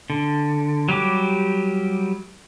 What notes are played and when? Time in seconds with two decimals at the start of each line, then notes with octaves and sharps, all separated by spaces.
0.10 D3
0.89 F#3 G3 G4 D6